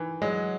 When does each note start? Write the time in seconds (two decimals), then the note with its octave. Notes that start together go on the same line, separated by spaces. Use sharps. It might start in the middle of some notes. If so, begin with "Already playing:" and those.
Already playing: D#3 E3
0.22 F#3 G#3